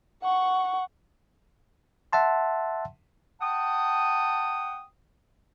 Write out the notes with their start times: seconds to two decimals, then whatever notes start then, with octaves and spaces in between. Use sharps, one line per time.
0.23 F#5 C#6
2.13 E5 F#5 A5 C6
3.40 F#5 G5 A5 D#6